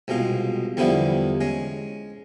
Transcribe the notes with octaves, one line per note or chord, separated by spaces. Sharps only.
C2 B2 G#3 F4
E2 D3 F3 G3 B3 E4
G#3 C#4